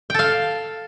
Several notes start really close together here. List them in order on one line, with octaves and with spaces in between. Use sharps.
G5 A4 F5